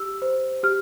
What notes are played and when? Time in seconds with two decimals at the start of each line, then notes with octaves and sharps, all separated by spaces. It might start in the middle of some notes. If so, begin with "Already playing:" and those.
Already playing: G4 E6
0.22 C5
0.63 G4 F6